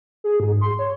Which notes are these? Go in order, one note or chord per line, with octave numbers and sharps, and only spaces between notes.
G#4
G#2
C6
C#5